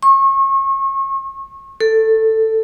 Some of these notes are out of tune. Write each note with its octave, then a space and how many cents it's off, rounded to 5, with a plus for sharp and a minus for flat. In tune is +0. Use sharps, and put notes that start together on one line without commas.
C#6 -35
A4 +10